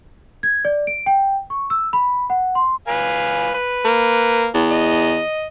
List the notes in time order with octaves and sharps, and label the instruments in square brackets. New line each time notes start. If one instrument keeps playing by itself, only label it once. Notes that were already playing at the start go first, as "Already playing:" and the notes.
[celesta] G#6
D5
D7
G5
C#6
E6
B5
F#5
C6
[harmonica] B4 F5 G#5
B4
[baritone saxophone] A#3
E2
[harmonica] D#5